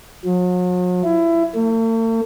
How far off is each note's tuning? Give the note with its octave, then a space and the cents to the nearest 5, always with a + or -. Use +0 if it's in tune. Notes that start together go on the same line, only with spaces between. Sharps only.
F#3 -45
E4 +20
A3 +45